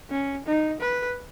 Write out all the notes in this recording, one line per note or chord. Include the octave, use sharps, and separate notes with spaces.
C#4
D#4
B4